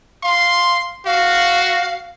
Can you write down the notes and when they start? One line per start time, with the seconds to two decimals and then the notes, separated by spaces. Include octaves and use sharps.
0.23 F5 C6
1.06 F#4 F5